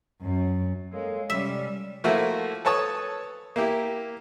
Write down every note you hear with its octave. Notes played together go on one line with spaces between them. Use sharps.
F#2
G#3 A#3 A4 C#5 F5
C3 G3 G#3 C#4 D5 E5
F3 A3 A#3 E4 F#4
A4 B4 C#5 A5 C#6 D#6
A#3 E4 G4